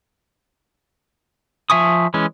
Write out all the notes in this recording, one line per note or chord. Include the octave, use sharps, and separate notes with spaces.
F3 E5 G#5 C#6 D#6
E3 G#3 C#4